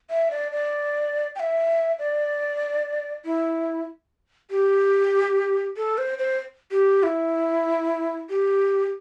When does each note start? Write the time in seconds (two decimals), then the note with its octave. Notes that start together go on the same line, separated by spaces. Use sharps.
0.10 E5
0.31 D5
0.52 D5
1.36 G5
1.40 E5
1.99 D5
3.25 E4
4.50 G4
5.77 A4
5.98 C5
6.19 C5
6.71 G4
7.03 E4
8.29 G4